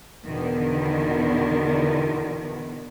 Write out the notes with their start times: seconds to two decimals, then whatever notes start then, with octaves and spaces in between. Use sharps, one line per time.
0.24 E2 B2 D3 D#3